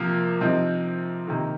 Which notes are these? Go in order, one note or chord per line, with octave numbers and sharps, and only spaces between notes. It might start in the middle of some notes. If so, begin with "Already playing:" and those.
Already playing: C3 F3 A#3 A#4
C3 F3 C4 D#4
C3 D#3 A#3